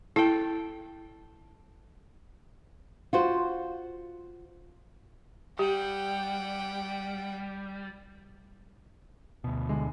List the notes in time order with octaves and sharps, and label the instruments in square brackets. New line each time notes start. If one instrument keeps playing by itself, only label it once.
[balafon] E4 [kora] A4 G5
[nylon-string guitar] F4 F#4 C5
[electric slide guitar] G3 [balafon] G4 [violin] F#5 G5
[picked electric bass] D2 B2
[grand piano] D3 G#3